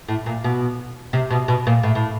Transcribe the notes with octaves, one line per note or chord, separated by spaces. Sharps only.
A2
A#2
B2
C3
B2
B2
A#2
A2
A2